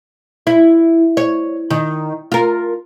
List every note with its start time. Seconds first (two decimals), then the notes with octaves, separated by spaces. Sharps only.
0.47 E4
1.17 C#5
1.71 D#3
2.32 F4 A#4